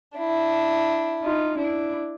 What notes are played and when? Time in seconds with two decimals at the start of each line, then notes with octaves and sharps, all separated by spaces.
0.18 D4 E4
1.22 D#4 F4
1.57 D4 E4